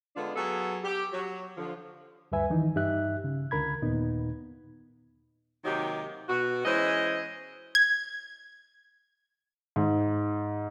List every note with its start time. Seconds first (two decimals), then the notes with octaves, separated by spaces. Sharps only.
0.16 D3 G#3 B3 D4 F4
0.36 F#3 B3 G#4 A4
0.84 G4
1.13 F#3
1.57 D3 F3
2.32 D2 G2 G3 B4 E5 G#5
2.50 D#3 E3 D#4
2.75 G2 D#4 G4 E5 F#6
3.24 C#3
3.51 C#2 D3 A#4 B5 G#6
3.82 D#2 A#2 B3 D#4
5.65 C3 D#3 F#3 A#3 D#4 G4
6.29 B2 F#4
6.65 E3 G#3 C#4 E4 C5 D#5
7.75 G#6
9.76 G#2